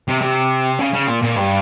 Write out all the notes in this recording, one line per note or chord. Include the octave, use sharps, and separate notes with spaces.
C3
C3
C#3
C#3
A#2
A#2
G2